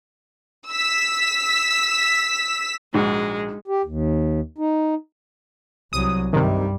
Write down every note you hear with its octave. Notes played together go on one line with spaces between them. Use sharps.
E6 B6
A#1 G#2 G#3 F#4
G4
D#2
D#4
C2 F#3 D#6
G2 C3 D#3 G3